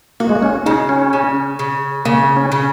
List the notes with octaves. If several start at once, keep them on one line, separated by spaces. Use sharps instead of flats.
A#3 F#4
G#3
A#3
C#4
C#3 D#4
C#4
C#3
C#3
C#3 A#3
C#4
C#3